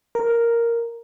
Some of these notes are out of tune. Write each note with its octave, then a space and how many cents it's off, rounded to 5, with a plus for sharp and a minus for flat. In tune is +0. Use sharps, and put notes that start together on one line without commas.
A#4 +0